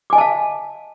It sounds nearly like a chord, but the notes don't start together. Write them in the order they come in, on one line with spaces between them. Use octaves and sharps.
D6 G#5 D#5 A5 F5